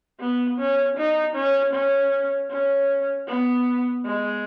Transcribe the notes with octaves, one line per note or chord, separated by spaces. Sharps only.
B3
C#4
D#4
C#4
C#4
C#4
B3
G#3